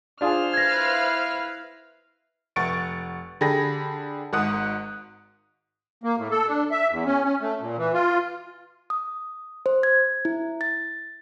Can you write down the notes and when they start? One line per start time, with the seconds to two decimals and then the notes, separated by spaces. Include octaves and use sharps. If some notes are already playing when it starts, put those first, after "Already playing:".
0.21 D4 F4 G#4 C5 F6
0.53 E4 B4 F5 G#6 A#6
2.56 F1 F#5 C#6 A6 D7
3.41 D3 G4 G#4 B5 A#6
4.33 G#1 G#2 F#5 D#6 F#6
6.04 A#3
6.18 A2
6.31 A4
6.47 D4
6.71 E5
6.91 E2
7.06 C#4
7.25 C#4
7.41 A3
7.61 A#2
7.78 E3
7.93 F4
8.90 D#6
9.66 C5
9.83 G#6
10.25 E4
10.61 A6